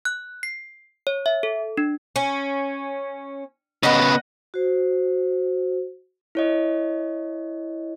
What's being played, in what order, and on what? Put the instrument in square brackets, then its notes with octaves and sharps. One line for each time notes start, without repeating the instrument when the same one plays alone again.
[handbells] F#6
C7
C#5
E5
A4
D4
[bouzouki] C#4
[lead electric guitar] C#3 B3 [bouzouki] D#5 F#5
[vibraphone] F#4 C5
[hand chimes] E4 C#5 D#5